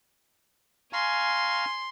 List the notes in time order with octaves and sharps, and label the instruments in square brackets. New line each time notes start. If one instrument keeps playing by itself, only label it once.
[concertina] F5 A#5 C#6 [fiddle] G#5 [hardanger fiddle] C6